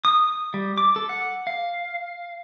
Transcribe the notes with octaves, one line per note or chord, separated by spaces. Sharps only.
D#6
G3
D6
A4
F#5
F5